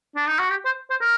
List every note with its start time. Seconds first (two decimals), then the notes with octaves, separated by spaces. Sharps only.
0.16 D4
0.27 D#4
0.39 F#4
0.50 G4
0.65 C5
0.90 C5
1.01 A#4